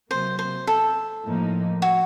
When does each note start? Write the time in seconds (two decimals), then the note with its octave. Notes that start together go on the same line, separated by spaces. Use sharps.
0.11 C3 F#3 A#3 C5
0.39 C5
0.67 A4
1.24 A2 F3 A#3 D#4
1.82 F#4